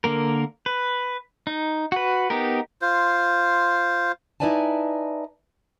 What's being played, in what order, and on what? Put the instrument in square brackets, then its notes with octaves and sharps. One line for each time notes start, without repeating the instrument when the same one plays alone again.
[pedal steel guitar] D3 A#3 A#4
B4
D#4
F#4 B4
B3 D#4 G4 A#4
[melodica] F4 C5
[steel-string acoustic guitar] D#4 E4 B4 D5 G#5 A5